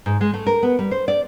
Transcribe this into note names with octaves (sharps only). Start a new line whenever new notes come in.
G#2
G#3
A3
A#4
B3
G3
C5
D5